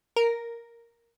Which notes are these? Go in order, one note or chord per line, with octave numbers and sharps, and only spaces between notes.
A#4